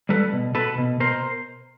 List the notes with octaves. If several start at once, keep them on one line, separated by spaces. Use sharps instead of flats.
G3 A4 B4
B2
B2 A4 B4
B2
B2 A#4 C5